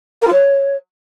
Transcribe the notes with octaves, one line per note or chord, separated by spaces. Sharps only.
A#4
F4
C#5